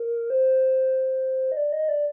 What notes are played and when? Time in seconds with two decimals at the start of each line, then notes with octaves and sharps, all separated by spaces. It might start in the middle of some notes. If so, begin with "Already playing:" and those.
Already playing: A#4
0.30 C5
1.52 D#5
1.57 D5
1.72 D#5
1.89 D5